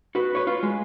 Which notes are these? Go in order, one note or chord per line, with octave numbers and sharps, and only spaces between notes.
F#4 B4
B4 C#5
F4
G#3